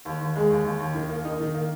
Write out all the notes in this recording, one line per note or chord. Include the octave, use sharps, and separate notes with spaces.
D#2
D#2
G#3
D#2
D#2
D#2
D#3
A#3
D#4
D#3
A#3